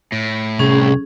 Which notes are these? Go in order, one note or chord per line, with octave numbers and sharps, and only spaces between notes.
A2
C2 C#4 G#4